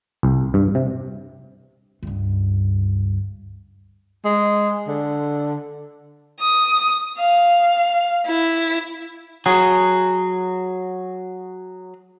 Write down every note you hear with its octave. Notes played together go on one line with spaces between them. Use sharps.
C2
G2
C3
C#2 G2
G#3
D3
D#6
F5
E4
F#3 G#4